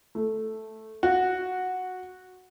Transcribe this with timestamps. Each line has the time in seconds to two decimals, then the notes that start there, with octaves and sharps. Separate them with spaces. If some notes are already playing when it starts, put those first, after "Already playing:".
0.15 A3
1.03 F#4